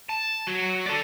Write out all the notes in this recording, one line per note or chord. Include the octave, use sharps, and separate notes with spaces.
A5
F#3 F#4
A4 D5